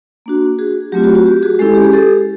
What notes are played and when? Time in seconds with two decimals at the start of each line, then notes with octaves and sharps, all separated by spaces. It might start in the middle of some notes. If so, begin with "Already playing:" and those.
0.26 A#3 D4 F#4
0.58 F#4 G#4
0.92 F#3 A3 C4 F4 G4
1.04 F#4
1.15 F#4
1.26 G4
1.43 F#4 G#4
1.59 G#3 C#4 E4 G4 A4
1.75 G4
1.84 G#4
1.93 G4 A4